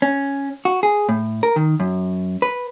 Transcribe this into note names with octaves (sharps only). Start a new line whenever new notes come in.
C#4
F#4
G#4
A2
A#4
D#3
F#2
B4